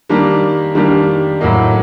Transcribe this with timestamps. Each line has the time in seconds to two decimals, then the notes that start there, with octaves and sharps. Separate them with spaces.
0.09 D#3 G3 A#3 D4 G4
0.75 D#3 G3 A#3 D4 G4
1.40 A2 F#3 A#3 D#4